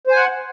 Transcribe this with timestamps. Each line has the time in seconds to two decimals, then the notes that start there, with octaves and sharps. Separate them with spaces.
0.07 C5
0.12 G#5
0.16 F#5